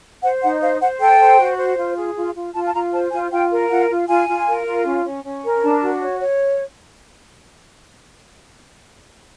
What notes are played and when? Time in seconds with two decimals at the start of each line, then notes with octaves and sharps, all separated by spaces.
0.23 C5 F#5
0.42 D#4 F#5
0.61 C5 F5
0.81 C5 F#5
0.99 A4 G5
1.20 C5
1.39 F#4
1.58 C5
1.77 F4
1.96 G#4
2.16 F4
2.35 F4
2.54 F4 A5
2.67 A5
2.73 F4 A#5
2.93 C5 A5
3.12 F4 G#5
3.31 F4 G5
3.51 A#4
3.70 F4 F#5
3.90 F4
4.08 F4 G#5
4.28 F4
4.47 A#4
4.66 F4
4.86 C#4
5.05 C#4
5.24 C#4
5.44 A#4
5.62 D4 A5
5.81 F#4
6.01 C#5
6.20 C#5